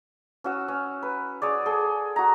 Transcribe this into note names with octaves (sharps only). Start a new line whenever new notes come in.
C#4 F#4 E6
C#4
B4
G#4 C#5 D5
G#4 A4 G5 C6
F#4 A#5